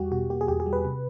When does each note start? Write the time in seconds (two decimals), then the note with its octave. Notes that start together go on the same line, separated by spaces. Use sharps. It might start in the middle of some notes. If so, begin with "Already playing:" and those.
Already playing: E2 G3 F#4 G4
0.12 B2 F#4
0.30 A#3 G4
0.41 G#4
0.48 E2 G4
0.60 G#4
0.66 G3
0.73 B4
0.85 C3